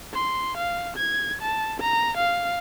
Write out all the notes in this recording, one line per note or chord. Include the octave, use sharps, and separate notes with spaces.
C6
F5
G#6
A5
A#5
F5